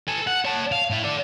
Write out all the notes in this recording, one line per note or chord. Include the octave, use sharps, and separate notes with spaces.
A4 G#5
F#5
C#5 A5
F5
A2 E4
A4 D5